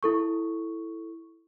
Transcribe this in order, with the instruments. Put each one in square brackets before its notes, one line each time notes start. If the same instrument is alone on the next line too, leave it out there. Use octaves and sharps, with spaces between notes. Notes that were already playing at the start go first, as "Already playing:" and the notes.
[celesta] E4 A4 C#6